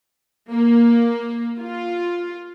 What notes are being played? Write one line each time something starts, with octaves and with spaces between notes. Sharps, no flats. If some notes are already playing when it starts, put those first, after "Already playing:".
A#3
F4